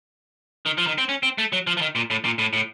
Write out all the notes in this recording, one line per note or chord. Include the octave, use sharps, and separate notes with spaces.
D#3
F3
D#3
C4
C#4
C4
A3
F#3
F3
F3
D#3
A#2
A2
A#2
A2
A2